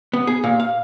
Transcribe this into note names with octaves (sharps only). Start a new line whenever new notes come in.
B3
G#4
A#2
F5